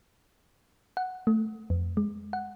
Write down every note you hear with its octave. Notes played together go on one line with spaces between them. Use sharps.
F#5
A3
F2
G#3
F#5